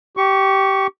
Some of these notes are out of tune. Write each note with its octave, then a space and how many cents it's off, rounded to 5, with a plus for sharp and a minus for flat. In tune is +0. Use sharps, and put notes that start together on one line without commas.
G4 -15 C#6 +10